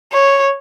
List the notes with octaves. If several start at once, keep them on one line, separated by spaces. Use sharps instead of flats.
C#5